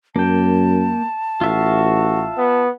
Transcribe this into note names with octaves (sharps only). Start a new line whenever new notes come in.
F#2 A#3 G5 A5
A1 F4 F#4 E5 F5
B3